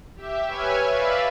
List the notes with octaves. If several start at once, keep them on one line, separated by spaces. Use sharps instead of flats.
G4 E5
B4 C#5 E5 G#5 F6 G#6
B4 D5 E5 F5 B5